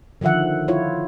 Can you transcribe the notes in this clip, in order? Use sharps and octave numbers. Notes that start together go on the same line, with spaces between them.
D3 D#3 F3 E5 F#5
E4 F4 C#5